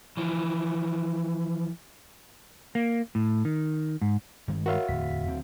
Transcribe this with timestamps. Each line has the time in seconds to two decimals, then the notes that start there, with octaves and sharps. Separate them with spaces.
0.17 E3 F3
2.75 A#3
3.15 A2
3.45 D#3
4.01 G#2
4.48 G2 D#3 G#3
4.66 F#4 A#4 C#5 E5 F5
4.89 D1 E2 B6
5.26 D1 D2 C4